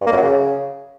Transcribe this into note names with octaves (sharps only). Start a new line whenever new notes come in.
G2
A#3
F#2
F#3
C#3